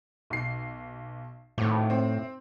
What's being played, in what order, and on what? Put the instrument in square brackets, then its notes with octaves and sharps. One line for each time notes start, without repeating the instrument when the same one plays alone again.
[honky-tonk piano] B1 C7
[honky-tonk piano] G#1 [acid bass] A2
[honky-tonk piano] C4